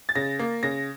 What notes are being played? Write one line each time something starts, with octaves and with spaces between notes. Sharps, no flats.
A6
C#3 A#6
A#3
C#3 A#6